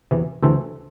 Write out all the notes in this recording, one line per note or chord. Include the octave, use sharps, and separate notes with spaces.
E2 C3 E3
D2 C3 E3 A4 C5